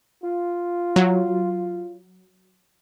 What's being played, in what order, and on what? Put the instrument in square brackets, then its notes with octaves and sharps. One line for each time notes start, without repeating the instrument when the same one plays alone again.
[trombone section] F4
[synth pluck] F#3